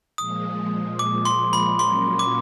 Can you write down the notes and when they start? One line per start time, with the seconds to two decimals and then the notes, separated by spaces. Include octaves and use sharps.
0.18 A#2 F3 G#3 D#6
0.99 D6
1.25 C6
1.53 B5
1.79 A#2 F#3 A#3 C#4 C6
2.19 D6